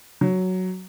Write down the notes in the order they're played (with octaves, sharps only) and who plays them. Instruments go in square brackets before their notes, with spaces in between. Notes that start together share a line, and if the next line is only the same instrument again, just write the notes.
[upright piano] F#3